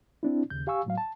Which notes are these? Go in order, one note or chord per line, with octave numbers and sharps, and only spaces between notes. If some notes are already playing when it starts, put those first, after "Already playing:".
C4 D4 E4
D#2 C#3 G6
G4 F5 G#5 C#6 E6
A2 F#3 F5
A5